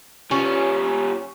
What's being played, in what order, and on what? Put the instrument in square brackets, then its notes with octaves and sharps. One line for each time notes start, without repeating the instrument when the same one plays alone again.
[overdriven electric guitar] G3 F4 [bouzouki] C#4